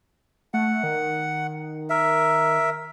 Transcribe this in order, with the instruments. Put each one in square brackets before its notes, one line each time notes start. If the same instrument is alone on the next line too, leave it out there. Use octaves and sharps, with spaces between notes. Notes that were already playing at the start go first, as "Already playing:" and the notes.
[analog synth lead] A3 [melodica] F#5
[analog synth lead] D#3
[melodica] A#4 E5